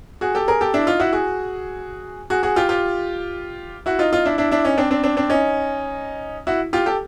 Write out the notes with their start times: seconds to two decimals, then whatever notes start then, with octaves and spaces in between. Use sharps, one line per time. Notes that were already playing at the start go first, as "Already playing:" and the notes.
0.21 F#4 G#4
0.35 G4 A4
0.48 G#4 A#4
0.61 G4 A4
0.74 D4 E4
0.87 D#4 F4
1.00 E4 F#4
1.13 F#4 G#4
2.30 F#4 G#4
2.43 F#4 G#4
2.56 F4 G4
2.69 F4 G4
3.86 E4 F#4
3.99 D#4 F4
4.13 D#4 F4
4.25 D4 E4
4.38 D4 E4
4.51 D4 E4
4.64 C#4 D#4
4.78 C4 D4
4.91 C4 D4
5.03 C4 D4
5.17 C4 D4
5.30 C#4 D#4
6.47 E4 F#4
6.73 F4 G4
6.86 G4 A4